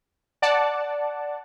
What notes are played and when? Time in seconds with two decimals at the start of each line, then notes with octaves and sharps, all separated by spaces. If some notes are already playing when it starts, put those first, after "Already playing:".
0.42 D5 F#5 A5